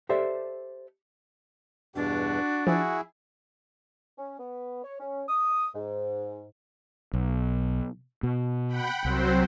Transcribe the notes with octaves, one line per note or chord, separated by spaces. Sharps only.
G4 A4 C5 D5 E5
E2 G2 B2 D4 F#4
F3 E4 F#4 G#4
C#4
B3
C#5
C#4
D#6
G#2
B1
B2
F#5 G5 B5
C2 F#3 C4 C5